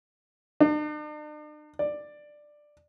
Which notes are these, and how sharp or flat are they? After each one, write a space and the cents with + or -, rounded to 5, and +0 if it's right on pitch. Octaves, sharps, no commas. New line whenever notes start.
D4 +45
D5 +10